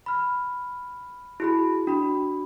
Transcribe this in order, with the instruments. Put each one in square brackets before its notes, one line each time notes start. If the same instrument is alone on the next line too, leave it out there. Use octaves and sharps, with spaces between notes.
[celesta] B5 F6
[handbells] E4 [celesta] F#4 G#4 B5
[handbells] D4 [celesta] F#4 B5